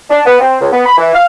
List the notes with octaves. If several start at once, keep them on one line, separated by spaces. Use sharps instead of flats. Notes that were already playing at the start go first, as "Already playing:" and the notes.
D4
B3
C4
C#2
B3
B5
E3
F5